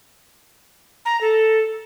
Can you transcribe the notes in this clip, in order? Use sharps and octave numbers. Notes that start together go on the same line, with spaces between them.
A#5
A4